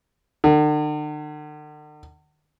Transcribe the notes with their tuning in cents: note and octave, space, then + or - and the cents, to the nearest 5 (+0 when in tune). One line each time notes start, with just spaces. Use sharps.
D3 +45